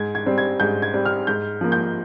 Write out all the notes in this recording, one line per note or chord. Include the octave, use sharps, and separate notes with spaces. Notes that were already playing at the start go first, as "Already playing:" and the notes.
Already playing: G#2 G#6
G#6
G3 C4
G#6
G#2 G6
G#6
G3 C4
F6
G#2 G6
F3 A#3
G6